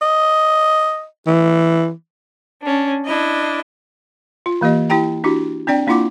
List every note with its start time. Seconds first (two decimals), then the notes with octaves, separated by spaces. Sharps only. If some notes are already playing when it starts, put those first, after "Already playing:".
0.02 D#5
1.27 E3
2.63 C#4 D4
3.05 D4 E4 D#5
4.46 F4
4.61 E3 A#3 G4 D#5
4.90 E4 G4 G5 A#5
5.24 D4 E4 F#4 G4
5.67 C4 D4 D5 G5
5.87 A#3 D4 E4 F4 F#5 D6